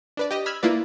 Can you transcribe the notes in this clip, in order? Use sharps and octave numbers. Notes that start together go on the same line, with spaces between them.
D4 B4 D5
G4 D#5
B5 E6 F6 G#6
A#3 E4 F4 B4 D5